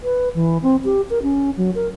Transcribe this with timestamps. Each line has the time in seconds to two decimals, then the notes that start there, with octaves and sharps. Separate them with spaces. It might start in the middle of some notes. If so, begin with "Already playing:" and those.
0.03 B4
0.35 E3
0.63 C4
0.85 G4
1.10 A#4
1.23 C#4
1.57 F#3
1.75 A#4